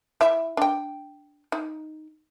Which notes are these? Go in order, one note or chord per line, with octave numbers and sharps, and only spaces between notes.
E4 E5
D4 G5
D#4